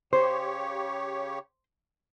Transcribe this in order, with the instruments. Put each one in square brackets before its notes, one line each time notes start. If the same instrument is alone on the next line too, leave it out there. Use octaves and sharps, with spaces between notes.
[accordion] C#3 G4 C#5 [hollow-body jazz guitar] C5